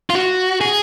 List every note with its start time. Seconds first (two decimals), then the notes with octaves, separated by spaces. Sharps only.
0.10 F4
0.15 F#4
0.61 G#4